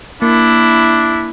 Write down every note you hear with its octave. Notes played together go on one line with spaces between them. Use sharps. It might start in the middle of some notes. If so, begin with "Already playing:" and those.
A#3 D4 E4